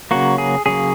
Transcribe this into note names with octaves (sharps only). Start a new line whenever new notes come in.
C#3 F#3 A#3 F#4
G#4
C#3 F#3 A#3 G#4